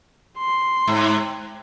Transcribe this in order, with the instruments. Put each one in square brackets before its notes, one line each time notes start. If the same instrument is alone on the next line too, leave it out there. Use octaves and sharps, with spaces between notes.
[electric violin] C6
[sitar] G#2